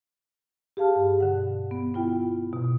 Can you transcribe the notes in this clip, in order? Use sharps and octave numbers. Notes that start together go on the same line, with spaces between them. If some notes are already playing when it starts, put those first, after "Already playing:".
G4 G#4 F5 A5 F6
G2
B2 D3 F#5
B3
B3 E4 F4 G5
B2